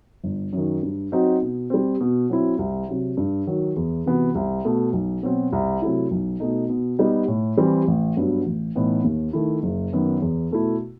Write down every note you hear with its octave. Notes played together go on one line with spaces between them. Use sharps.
G1
F#2 D#3
G2
F#3 C4 D#4 F#4
B2
G3 C4
B2
F#3 C4 E4
C2
C3 F#3
G2
D#3 F#3
E2
C3 E3 B3 F#4
C2
B2 A3
B1
B2 F#3 C4 F#4
C2
C3 F#3 A3 E4
B1
B2 A3 D#4
B2
G3 B3 D#4
A2
E3 G3 C4
A1
G2 F#3 B3
A1
A2 E3 B3 D#4
D#2
D#3 A3 E4
F#1
F#2 D#3 F#3 B3
E2
B2 A3 E4